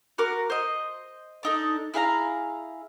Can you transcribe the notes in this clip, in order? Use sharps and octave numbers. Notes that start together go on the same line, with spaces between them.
F#4 A#4 D6
C5 D#5
D4 D#4 A4
E4 G#4 F5 A#5